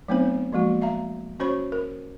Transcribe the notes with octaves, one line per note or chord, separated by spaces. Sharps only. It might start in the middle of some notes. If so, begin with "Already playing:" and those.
F#3 A3 B3 C4 D#4 C5
F3 G#3 A#3 F#4
E5 F5 A#5
C#4 F#4 C5 C#5 B5 C#6
A#4